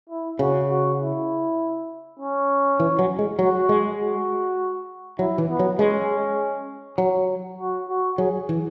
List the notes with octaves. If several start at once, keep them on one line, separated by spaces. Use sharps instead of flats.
E4
C#3 F#4
F#4
E4
C#4
E3
F#3
G#3
F#3 F#4
G#3
F#4
F#3 E4
E3
B3
F#3
G#3 C#4
F#3
F#4
F#4
F#3 G#4
E3